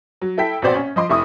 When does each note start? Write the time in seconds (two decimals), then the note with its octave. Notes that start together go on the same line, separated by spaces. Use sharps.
0.22 F#3
0.38 E4 A4 G5 B6
0.62 A#1 B2 C4 C5 D5 F#5
0.75 C#4
0.96 F3 D#5 C6 D6
1.10 F1 E4 C#6 D#6